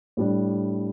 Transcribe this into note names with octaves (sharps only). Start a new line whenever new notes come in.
A2 G3 D4